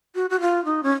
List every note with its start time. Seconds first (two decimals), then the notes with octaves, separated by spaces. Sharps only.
0.15 F#4
0.30 F#4
0.41 F4
0.65 D#4
0.83 C#4